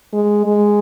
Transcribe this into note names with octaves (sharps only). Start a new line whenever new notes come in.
G#3
G#3